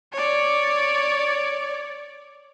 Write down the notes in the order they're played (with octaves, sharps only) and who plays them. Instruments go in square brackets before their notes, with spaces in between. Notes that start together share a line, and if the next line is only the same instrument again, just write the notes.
[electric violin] C#5 D5